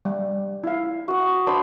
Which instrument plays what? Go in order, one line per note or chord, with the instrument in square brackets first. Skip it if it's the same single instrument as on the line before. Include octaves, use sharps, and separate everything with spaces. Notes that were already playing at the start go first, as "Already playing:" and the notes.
[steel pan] G3
E4 F5
[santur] F#4 D#6
D4 C5 B5